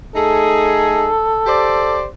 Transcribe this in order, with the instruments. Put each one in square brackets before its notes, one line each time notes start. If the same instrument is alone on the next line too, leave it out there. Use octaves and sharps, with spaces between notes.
[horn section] A3 D#4 G#4 [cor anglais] A4
[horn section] G4 C5 D5